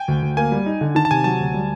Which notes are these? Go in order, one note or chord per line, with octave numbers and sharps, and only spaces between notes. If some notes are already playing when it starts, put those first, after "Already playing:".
Already playing: G5 G#5
D2
D2
A#3 G#5
G3
D#4
D3
D#3 A5
A5
C3 G#5
F#3 A5
D2
G3